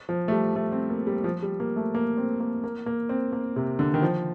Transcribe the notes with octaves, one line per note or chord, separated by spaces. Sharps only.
F3
A3
G3
A3
C4
A#3
G3
F3
G3
A#3
A3
A#3
C4
A#3
A#3
A#3
C4
A#3
C3
D3
D#3
F3